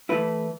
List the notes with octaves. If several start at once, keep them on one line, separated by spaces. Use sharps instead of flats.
E3 A3 E4 B4